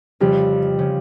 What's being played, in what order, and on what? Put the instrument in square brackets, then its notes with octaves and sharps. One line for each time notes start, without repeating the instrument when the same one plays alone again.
[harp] F2 C#3 F3 [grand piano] G3
[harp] C#3 F3